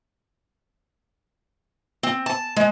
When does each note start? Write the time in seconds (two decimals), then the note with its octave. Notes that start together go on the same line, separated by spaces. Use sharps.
2.03 C4
2.26 A5
2.56 G#3